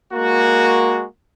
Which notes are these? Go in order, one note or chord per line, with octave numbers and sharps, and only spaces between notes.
G#3 A#3 F#4